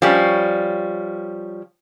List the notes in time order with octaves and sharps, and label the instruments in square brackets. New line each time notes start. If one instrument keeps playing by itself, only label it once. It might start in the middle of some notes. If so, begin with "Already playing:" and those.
[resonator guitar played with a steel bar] F3 G3 C#4